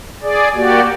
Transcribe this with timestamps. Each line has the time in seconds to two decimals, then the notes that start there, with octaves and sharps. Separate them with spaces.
0.22 G#4 D5
0.55 A#3 F#4 G4 D5